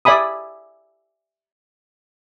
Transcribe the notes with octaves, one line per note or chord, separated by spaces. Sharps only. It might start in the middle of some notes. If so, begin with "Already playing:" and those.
D5 E5 G#5 B5 D#6